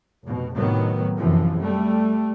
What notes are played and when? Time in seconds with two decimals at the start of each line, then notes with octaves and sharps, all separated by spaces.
0.23 F1 B2
0.54 A2 C3 D#3 F#3 B3
1.17 F#2 C3 E3 F3
1.58 G3 A3